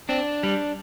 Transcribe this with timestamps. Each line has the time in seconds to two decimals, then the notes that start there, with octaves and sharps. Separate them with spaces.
0.09 C4 D4
0.43 G3